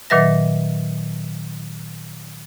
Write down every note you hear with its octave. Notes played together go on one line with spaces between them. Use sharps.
A#2 D#3 F#3 B4 E5 A#6